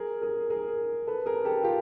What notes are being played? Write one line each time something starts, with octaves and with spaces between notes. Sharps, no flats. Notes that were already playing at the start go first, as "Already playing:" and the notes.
Already playing: G#4 A#4
G#4 A#4
G#4 A#4
A4 B4
G#4 A#4
G4 A4
F4 G4